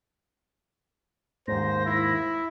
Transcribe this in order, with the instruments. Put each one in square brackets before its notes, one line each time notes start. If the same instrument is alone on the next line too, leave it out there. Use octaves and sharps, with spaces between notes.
[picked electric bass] D#2 G#2 [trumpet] C5 [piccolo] A#6
[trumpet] E4